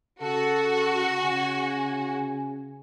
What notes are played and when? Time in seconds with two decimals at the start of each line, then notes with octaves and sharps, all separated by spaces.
0.22 C#3 F#4 A4
1.22 C#3 G#5